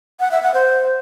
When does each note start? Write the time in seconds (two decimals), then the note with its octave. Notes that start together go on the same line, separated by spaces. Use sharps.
0.20 F#5
0.31 E5
0.43 F#5
0.54 C5